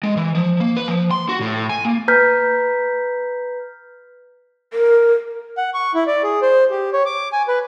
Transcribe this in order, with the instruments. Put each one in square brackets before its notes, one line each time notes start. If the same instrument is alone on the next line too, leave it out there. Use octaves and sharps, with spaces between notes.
[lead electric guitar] G#3
E3
F3
A#3
B4
F3
C6
F#4
A2
G#5
A#3
[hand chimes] B4 A#5 F6 G6 B6
[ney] A#4
[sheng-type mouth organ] F#5
C#6
E4
D5
G#4
C5
G4
C#5
D6
G#5
B4